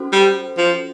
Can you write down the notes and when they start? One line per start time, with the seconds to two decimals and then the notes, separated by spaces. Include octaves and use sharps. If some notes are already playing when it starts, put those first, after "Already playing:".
Already playing: C#4 F#4 A4 C5
0.12 G3
0.57 F3